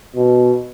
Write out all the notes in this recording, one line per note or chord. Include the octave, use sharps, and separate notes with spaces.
B2